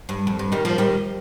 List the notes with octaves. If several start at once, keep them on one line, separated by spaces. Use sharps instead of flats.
G2
F2
G2
D#3 G3
F3 A#3
D#3 G3